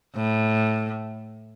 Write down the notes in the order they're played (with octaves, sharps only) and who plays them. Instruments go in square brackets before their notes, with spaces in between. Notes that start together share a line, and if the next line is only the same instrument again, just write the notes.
[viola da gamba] A2